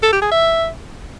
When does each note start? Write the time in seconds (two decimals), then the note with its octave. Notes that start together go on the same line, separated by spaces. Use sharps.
0.03 A4
0.12 G4
0.22 G#4
0.31 E5